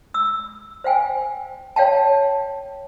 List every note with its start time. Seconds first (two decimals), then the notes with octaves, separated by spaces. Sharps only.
0.14 E6
0.84 C5 F5 G5 G#5
1.76 C#5 F5 G5 A5